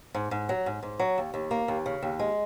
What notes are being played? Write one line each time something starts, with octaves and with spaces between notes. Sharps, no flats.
G#2
G#2
F#3
G#2
G#2
F#3
D#2
D#2
A#3
D#2
C#3
D#2
G#3